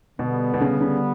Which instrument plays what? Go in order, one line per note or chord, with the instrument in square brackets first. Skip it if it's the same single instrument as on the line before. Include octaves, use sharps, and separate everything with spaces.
[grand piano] B2 [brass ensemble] D3 G3 B3
[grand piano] B2
C#3
C#3